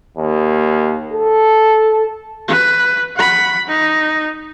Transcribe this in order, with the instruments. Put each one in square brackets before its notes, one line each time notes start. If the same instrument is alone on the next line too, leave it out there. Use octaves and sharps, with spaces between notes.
[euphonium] D#2
A4
[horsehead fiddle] B4
F#5 B5
D#4